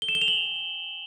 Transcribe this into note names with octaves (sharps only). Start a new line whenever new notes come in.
G7
E7
G7
F7
F#7